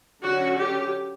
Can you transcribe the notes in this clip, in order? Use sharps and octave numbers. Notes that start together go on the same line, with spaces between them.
D3 F#3 C#4 F#4
G4